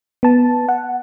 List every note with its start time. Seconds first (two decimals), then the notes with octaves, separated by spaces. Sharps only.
0.23 B3 A5
0.69 F#5